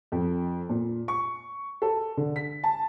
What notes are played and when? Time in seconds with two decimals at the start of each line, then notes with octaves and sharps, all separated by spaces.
0.12 F2
0.69 A#2
1.08 C#6
1.82 A4
2.17 D3
2.36 B6
2.64 A5